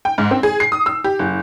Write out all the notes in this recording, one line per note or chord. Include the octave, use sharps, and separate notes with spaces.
G5
G#2
C4
G#4
C7
D#6
E6
G4
F#1